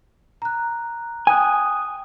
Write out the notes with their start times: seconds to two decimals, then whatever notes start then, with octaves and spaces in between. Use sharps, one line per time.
0.42 A#5 F#6
1.27 G5 G#5 D#6 F#6